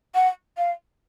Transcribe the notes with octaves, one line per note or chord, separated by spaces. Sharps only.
F#5
F5